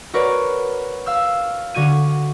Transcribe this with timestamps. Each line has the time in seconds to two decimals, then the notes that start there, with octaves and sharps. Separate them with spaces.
0.14 F#4 A#4 B4 C#5 D5
1.06 F5 E6 F6
1.74 D3 F#4 G#6 D#7